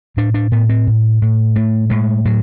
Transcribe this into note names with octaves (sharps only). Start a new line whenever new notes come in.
A2 D4
D4
A2 B3
C4
A2
A2
A2 A3
A2 G#3
A2 F#3